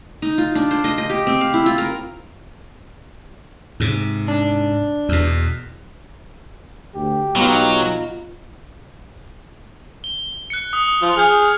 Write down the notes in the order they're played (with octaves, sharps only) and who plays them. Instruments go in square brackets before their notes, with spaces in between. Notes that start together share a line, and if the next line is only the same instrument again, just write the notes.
[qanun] D#4
F4
D4
C5
D#5
D#5
G4
C4
F5
E4
F4
A#4
[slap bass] G#2 C3
[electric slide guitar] D4
[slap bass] E2 B2
[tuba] D2 [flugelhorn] G4
[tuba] B1 [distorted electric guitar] F#3 [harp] B3 D#4 F4
[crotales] G7
F#6 C#7
D#6
[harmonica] F3 [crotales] F7
[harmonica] G#4 [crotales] F6 G6